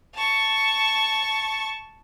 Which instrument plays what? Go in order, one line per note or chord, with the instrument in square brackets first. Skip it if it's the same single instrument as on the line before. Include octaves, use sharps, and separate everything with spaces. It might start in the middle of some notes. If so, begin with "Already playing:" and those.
[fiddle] A5 C#6